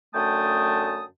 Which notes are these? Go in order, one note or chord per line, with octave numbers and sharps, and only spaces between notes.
F#2 D3 A3 G5 A5 D#6